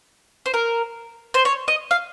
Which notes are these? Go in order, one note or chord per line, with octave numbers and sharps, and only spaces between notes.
C5
A#4
C5
C#5
D#5
F5